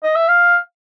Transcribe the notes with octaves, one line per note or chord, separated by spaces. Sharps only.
D#5
E5
F5